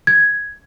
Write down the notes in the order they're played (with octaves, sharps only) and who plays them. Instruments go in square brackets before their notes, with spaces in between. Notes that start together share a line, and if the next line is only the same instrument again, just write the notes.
[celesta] G#6